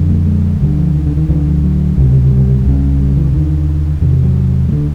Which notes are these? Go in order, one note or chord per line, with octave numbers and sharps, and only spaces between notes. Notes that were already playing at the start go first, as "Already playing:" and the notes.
Already playing: F2 D3
A3
G#3
D2 D3 G3
F3
D#3
D3
D#3
D2 D3 E3
F3
F#3
C#2 C3
G3
C#2 C#3
G3
E3
D#2 D3 D#3
E2 C3 D#3
F#3
D2 D3 G3